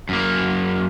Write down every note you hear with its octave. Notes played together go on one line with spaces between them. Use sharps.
F#2 A#3